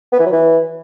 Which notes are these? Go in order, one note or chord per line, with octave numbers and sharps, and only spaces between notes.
B3
E3
F#3
E3